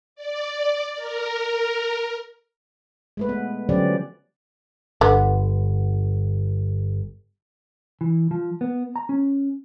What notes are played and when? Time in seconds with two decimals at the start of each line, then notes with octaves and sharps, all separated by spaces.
0.16 D5
0.96 A#4
3.17 G#3 A3 B4
3.29 B3
3.69 D3 F3 F#3 C#4 G4 D5
5.01 G1 D3 B3
8.01 E3
8.31 F3
8.61 B3
8.96 A#5
9.09 C#4